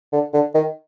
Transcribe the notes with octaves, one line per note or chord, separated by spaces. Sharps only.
D3
D3
D#3